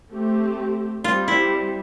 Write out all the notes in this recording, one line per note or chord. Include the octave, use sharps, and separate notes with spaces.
A3 C4 G4
G3 C4 F4 G4
E4